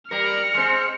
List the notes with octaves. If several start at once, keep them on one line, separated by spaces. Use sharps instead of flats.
G3 A#4 F6 C#7
G#3 C4